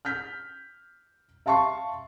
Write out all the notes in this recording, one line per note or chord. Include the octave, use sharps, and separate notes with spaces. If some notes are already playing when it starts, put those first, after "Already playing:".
F6 G6 B6
E5 F5 A5 C6 C#6 C7